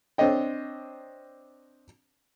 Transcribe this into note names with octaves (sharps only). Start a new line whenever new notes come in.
C4 D4 C#5 D#5 G5